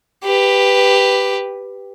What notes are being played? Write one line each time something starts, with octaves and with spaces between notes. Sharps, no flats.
G4 B4